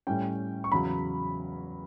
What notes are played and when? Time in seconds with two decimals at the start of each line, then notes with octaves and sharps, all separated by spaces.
0.07 A2 G3 C#4 G5
0.64 C#6
0.72 E2 C#3 F#3 B5